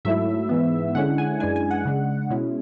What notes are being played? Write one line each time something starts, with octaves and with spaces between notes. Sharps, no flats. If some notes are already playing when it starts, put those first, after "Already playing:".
G#2 F#3 A3 E4 E5
G#2 E3 B3
D3 G#3 C#4 E4 F#5
G#5
F#2 E3 G#3 D4 G#5
G#5
F#5
C#3 G#3 D4
B2 G#3 C#4 E4